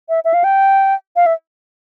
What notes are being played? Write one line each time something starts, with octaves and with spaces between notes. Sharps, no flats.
E5
E5
F5
G5
F5
E5